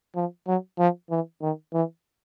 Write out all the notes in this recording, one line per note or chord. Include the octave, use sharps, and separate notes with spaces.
F3
F#3
F3
E3
D#3
E3